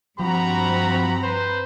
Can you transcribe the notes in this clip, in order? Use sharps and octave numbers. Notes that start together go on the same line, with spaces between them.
G2 F3 C4 F#4 A#5 B5
B4 C5